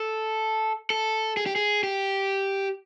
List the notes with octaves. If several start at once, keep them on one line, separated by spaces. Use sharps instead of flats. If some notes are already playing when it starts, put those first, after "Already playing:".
Already playing: A4
A4
G#4
G4
G#4
G4